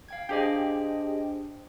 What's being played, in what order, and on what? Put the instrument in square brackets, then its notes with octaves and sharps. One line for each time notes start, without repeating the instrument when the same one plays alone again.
[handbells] F5 G5 G#6
[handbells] D4 C5 G5 [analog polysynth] G4 G#4 D#5